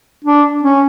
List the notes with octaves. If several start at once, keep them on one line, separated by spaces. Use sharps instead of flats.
D4
C#4